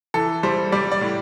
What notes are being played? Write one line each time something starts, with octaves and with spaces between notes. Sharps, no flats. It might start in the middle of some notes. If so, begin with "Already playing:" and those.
E3 A4
G3 C5
G3 D5
D5
A2